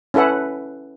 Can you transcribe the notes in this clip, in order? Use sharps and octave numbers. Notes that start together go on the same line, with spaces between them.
C#4 E4 A4 B4 F#5